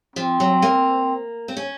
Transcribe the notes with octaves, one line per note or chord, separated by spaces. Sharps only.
F3 C4
F#3
A#3
C4
C#4